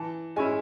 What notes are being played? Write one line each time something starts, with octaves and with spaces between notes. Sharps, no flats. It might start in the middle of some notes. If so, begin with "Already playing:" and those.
Already playing: E3 A5
G#3 C#4 E4 G#5